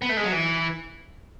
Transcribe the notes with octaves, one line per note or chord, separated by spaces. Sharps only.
B3
A3
G#3
F#3
E3